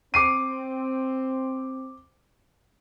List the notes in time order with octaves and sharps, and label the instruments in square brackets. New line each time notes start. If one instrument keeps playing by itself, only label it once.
[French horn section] C4 [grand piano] D6 C7 D#7